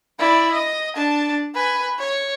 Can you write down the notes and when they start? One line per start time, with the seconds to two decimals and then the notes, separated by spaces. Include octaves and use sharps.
0.19 E4 D5
0.52 D#5
0.96 D4 A5
1.54 B4 G#5
1.99 C#5